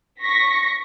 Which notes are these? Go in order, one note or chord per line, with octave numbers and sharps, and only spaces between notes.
C#6 A#6 B6